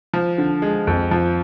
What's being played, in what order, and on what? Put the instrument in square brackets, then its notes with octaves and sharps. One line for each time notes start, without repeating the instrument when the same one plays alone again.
[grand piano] F3
D3
G#3
F2
F3